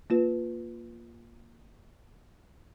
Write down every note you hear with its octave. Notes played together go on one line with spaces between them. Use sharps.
A#3 F4 B4